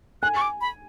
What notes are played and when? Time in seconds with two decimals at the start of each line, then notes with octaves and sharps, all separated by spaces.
0.22 G#5 F#6
0.36 C#6
0.41 D6
0.61 B5